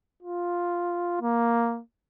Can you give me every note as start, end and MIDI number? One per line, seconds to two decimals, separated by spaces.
0.23 1.21 65
1.21 1.80 58